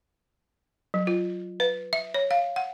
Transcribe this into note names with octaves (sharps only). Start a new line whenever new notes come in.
F#3
F4
B4
E5
C#5
F5
F#5